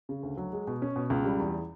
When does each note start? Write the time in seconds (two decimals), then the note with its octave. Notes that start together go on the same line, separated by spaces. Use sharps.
0.09 C#3
0.23 D2
0.37 F#3
0.53 G#3
0.67 B2
0.82 C#4
0.96 B2
1.10 C#2
1.25 G3
1.40 E2